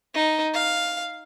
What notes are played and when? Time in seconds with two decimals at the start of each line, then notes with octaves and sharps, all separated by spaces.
0.15 D#4
0.54 F5